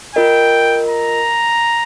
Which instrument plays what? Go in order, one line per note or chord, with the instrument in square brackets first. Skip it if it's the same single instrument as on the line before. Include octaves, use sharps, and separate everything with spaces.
[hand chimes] F4 A#4 D#5 [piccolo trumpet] G5
[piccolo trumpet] A#5